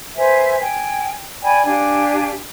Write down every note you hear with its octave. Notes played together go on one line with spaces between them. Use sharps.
B4 C5 E5 G#5
G5 G#5
D5 G5 G#5 B5
D4 G4 F5 G#5